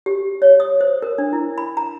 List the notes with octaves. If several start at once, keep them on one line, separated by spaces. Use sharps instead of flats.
G4
C#5
D#6
C5
A#4
D4
E4
B5
A#5